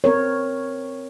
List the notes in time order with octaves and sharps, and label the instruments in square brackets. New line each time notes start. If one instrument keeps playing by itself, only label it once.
[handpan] C4 A#4 C#5